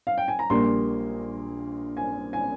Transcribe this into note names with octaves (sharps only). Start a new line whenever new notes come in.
F5
G5
G#5
A#5
A#1 A#2 G3 A#3 C6
G#5
G#5